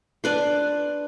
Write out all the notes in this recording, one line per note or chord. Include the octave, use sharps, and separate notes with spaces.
D4 B4 C6